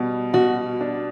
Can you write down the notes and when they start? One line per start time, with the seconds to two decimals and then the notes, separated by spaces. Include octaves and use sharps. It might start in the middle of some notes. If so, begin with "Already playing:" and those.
Already playing: B2 G3
0.33 B2 F#4
0.81 D4